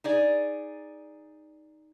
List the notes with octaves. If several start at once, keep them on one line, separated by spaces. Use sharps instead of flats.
D#4 G#4 D5